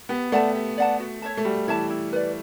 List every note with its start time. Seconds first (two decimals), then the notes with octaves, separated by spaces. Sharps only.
0.09 B3 G4
0.32 A3 D5 F#5 A5
0.55 G4
0.78 D5 F#5 A5
1.00 F#4
1.22 C#5 E5 A5
1.37 A3
1.45 G3 F#4
1.67 E3 C#5 E5 A5
1.90 E4
2.13 B4 D5